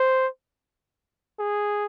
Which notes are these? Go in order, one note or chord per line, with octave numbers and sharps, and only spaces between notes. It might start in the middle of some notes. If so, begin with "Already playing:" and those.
Already playing: C5
G#4